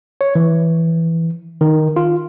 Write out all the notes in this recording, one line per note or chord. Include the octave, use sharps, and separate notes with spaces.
C#5
E3
D#3
F4